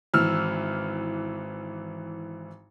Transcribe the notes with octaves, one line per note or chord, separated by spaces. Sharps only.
G#1 E3 E6 F6